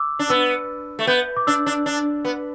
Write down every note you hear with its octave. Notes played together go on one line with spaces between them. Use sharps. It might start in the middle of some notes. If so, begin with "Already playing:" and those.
Already playing: D6 E6
D4
B3 E6
A3
B3 G6
D6
D4 E6
D4
D4
B3